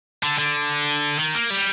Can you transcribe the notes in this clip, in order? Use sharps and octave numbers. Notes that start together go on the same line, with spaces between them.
D3
D3
D#3
A#3
G3